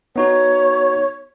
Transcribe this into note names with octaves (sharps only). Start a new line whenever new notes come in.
B3 D#4 F#4 C#5